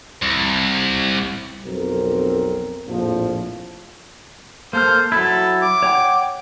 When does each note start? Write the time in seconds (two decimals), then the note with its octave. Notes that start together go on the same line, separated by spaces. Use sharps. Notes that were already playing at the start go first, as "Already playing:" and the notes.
0.22 C2
1.64 B1 F2 C4 A#4
2.87 A#1 F2 A2 F3
4.73 A#3 A4 C5 F6
5.12 F#3 E4 A4
5.62 D6
5.83 C#5 F#5 G5